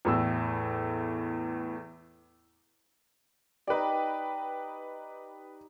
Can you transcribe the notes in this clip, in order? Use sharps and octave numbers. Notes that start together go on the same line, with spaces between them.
E2 A2 E6
D#4 G4 B4 D5